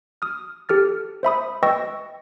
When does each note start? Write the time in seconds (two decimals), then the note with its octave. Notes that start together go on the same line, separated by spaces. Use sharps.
0.22 D#6 F6
0.69 G4 A4 F6 A6
1.23 C5 E5 B5 D#6
1.63 B4 D#5 G5 C#6 E6 A#6